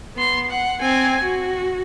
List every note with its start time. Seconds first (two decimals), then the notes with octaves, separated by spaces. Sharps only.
0.16 B3 C6
0.50 F#5
0.81 C4 G#5
1.22 F#4